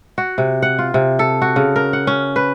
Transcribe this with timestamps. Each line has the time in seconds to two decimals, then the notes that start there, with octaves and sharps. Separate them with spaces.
0.18 F#4
0.38 C3
0.62 F#5
0.79 F4
0.94 C3
1.19 A4
1.42 F#4
1.56 C#3
1.76 A#4
1.93 F#5
2.07 C#4
2.36 B4